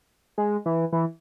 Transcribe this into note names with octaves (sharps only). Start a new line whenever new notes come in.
G#3
E3
E3